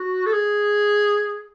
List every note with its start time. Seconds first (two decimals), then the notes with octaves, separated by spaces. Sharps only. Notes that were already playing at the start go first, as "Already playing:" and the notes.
Already playing: F#4
0.26 A4
0.33 G#4